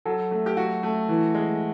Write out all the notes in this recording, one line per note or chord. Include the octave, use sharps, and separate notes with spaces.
F#3 A4
A3
G4
F#3 F#4
A3
E3
G#3